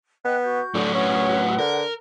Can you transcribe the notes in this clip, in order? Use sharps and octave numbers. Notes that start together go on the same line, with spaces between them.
B3 D#5 G5 F#6
F#4 G6
A2 D3 F#3
C#4 B4 F#5
D3 A#4